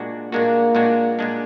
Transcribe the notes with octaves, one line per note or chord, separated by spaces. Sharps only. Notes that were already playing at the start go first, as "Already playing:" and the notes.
Already playing: A#2 G#3 D4 F#4
A#2 G#3 A#3 D4 F#4
A#2 G#3 D4 F#4
A#2 G#3 D4